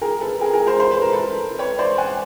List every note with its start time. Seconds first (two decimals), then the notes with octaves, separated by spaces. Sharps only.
0.02 G#4 A#4
0.21 A4 B4
0.41 G#4 A#4
0.53 G#4 A#4
0.66 A#4 C5
0.80 C5
0.91 B4
1.02 A#4
1.12 A4 B4
1.59 B4 C#5
1.79 C5 D5
1.98 F#5 G#5